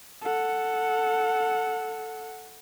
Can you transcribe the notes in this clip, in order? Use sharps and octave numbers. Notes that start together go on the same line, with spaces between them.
A4 F#5